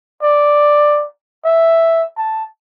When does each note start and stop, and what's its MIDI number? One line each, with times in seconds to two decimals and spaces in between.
0.23 1.06 74
1.45 2.05 76
2.18 2.44 81